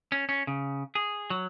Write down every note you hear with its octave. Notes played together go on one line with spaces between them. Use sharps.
C#4
C#4
C#3
G#4
F#3